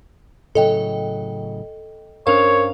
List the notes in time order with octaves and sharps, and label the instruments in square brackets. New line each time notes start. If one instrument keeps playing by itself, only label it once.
[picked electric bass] A2 C#3 F#3 [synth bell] A4 D#5 G5
[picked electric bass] G2 C#4 D4 [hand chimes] A#4 C5 [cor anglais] C#5 [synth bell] F5 F7